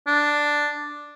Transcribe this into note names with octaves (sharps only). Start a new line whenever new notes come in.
D4